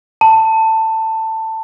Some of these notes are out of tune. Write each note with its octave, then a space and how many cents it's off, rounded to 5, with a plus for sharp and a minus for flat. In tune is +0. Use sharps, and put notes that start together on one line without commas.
A5 +15